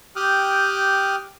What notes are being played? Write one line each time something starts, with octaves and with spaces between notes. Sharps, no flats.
G4 G5 D6 D#6 F6 F#6